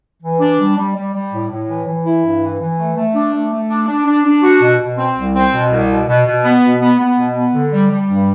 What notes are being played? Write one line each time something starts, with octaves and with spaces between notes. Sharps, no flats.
E3
D4
G3
G3
G3
G3
A2
A2
E3
E3
E4
G2
E3
E3
A3
A3
D4
A3
A3
D4
D4
D4
D4
F#4
B2
B2
C4
C2
C4
B2
C2
B2
B2
B2
B3
B2
B3
B3
B2
B3
D3
G3
G3
G2